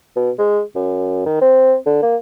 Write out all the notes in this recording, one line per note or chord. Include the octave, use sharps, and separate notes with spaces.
B2
G#3
F#2
D#3
C4
D3
A#3